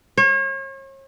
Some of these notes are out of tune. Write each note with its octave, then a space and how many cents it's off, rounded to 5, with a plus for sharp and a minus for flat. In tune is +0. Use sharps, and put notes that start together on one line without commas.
C#5 -40